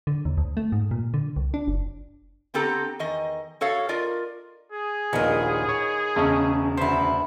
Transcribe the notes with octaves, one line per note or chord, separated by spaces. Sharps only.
D3
D#2
D2
A3
G#2
A#2
D3
C2
D4
F#1
D3 B3 C4 G4 A4 A#5
E2 D#3 D#5
F#4 A4 C#5 F5
F4 A#4 D5 D#5
G#4
A#1 D#2 A#2 D#3 B3 D#5
C#5
E1 C#3 A3 C#4 D#5
D2 B3 E4 C5